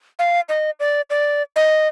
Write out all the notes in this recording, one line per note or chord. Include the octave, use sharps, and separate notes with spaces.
F5
D#5
D5
D5
D#5